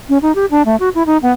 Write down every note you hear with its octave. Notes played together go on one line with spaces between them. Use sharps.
C#4
D#4
G4
D4
A3
F#4
E4
D#4
B3